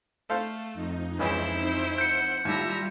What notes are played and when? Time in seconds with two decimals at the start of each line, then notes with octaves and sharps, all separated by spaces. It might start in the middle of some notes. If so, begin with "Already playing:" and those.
0.30 A3 A4 C5 F5
0.74 F2 D#4
1.19 C#2 C#3 E3 E4 C5
1.98 F#5 G6 C#7
2.45 D#2 A2 G3 F4 E5 A#5